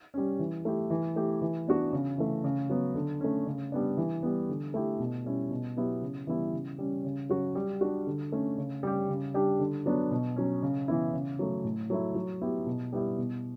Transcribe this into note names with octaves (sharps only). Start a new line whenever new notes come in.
G3 C#4
E3
A3 E4 G4
E3
A3 E4 G4
E3
B3 D4 F#4
C#3
E3 A3
C#3
F#3 B3
D3
A3 C#4
C#3
G3 B3 D4
E3
G3 B3
D3
A3 E4 G4
B2
G3 C#4 E4
B2
F#3 B3 E4 G4
C#3
E3 G3 B3 E4
C#3
G3 C#4
C#3
F#3 C#4 F#4
G3
D4 F#4
D3
A3 C#4
C#3
G3 C#4 G4
C#3
G3 D4 G4
D3
F#3 B3 D4
B2
F#3 C#4
C#3
E3 B3 E4
C#3
F#3 A3
A2
F#3 A3 E4
F#3
B3 E4 G4
B2
G3 B3 E4 G4
B2